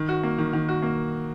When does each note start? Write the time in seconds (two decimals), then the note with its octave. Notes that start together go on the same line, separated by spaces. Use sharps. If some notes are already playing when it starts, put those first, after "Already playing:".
Already playing: D#3
0.09 F#4
0.23 A#3
0.38 D#3
0.53 D#3
0.69 F#4
0.83 A#3